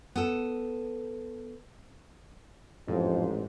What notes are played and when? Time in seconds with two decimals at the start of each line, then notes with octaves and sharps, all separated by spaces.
0.16 B3 A4
2.88 A1 F2 G#2